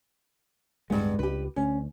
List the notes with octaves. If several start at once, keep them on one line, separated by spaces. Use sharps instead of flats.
D1 G2 G#3 B3
C#2 G4 B4
D2 C#4